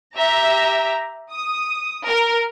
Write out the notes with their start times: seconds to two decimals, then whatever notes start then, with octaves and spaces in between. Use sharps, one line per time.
0.15 G4 E5 A#5
1.31 D#6
2.05 A#4